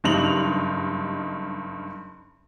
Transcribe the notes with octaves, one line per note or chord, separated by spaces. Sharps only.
F#1 G2 D#4 F7 F#7